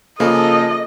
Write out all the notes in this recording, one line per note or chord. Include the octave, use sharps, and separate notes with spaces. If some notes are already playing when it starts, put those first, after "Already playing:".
C#3 F3 A#3 G#4 A4 D#5